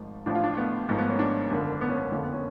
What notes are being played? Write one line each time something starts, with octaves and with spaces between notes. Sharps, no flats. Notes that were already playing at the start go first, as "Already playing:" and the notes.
Already playing: G#1 G#2 F3 A3
A1 A2 F3 D4
F4
D4
A3
B3
G#1 G#2 F3 A3
B3
C#4
D4
G#1 F#2 D3 F3
B3
C#4
B3
F#1 F2 D3 F3
B3
C#4